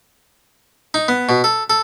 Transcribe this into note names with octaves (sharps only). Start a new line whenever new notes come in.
D#4
B3
B2
A4
A4